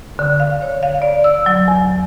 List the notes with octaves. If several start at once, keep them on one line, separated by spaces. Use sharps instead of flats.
D3
F5
C#5
F5
D5
E6
F#3
E2